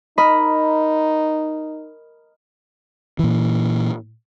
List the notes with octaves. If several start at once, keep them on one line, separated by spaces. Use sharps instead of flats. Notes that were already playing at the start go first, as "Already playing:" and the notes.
D#4 A#4 D#5 B5
A#2 E3